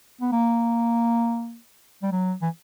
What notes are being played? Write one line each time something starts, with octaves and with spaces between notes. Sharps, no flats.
B3
A#3
G3
F#3
E3